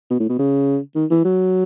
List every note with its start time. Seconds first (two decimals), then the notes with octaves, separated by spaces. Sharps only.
0.10 B2
0.20 A2
0.29 B2
0.39 C#3
0.95 D#3
1.10 E3
1.25 F#3